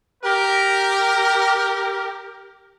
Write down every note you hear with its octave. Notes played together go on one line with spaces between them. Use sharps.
G4 A#4